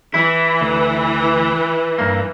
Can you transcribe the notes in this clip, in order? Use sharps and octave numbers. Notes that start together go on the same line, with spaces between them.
E3 E4
D2
G2 A#3